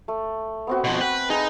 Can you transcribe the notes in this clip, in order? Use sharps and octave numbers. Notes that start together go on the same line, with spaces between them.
A3
B3 C4 F#4
B2 F3
B4 G5
D#4 G#4 B4 A#5